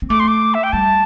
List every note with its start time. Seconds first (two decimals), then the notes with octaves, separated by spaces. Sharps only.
0.02 C4
0.10 A3 D6
0.20 C6
0.28 D6
0.54 E5
0.64 G5
0.73 G3 A5